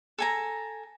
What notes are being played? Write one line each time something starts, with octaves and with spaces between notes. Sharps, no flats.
A4 G#5 A#5